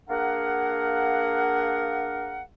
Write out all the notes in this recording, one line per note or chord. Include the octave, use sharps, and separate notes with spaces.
A#3 D4 G#4 A#4 F5 F#5